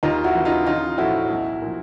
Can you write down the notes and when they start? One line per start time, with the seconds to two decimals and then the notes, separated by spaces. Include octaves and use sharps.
0.03 D#2 D#4 F4
0.24 E4 F#4
0.35 C#3 E3
0.45 D#4 F4
0.66 A1 D#4 F4
0.98 A2 F3 E4 F#4
1.31 B1
1.62 A#2 F3